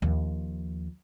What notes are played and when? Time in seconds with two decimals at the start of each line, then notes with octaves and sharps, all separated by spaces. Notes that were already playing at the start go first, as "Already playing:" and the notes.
0.02 D#2 F3